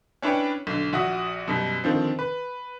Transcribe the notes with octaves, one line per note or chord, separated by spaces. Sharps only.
C#4 D4 E4 B4 C#5 G5
B1 D3
A#1 F#4 E5 D#6
F#2 B2 G3
D3 D#3 F3 C4
B4